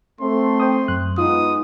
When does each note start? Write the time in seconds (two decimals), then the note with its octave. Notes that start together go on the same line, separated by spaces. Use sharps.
0.21 A3 C4 C6
0.60 C5 G5 D#6
0.88 F#2 F#6
1.18 G#3 B3 D#4 F4 D#6